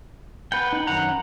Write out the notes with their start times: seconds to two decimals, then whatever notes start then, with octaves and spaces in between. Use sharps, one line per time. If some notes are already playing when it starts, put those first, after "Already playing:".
0.52 B4 F#5 G5
0.73 D#4
0.87 F#2 D#3 F#5 A#5